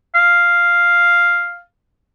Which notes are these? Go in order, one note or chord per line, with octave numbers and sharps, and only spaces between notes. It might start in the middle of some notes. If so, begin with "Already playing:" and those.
F5